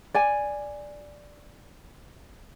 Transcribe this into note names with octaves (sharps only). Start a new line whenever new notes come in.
D5 G#5